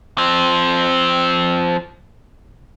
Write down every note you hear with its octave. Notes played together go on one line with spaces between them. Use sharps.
F3 C4